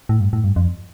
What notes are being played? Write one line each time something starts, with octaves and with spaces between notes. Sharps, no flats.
A2
G2
A2
G2
F2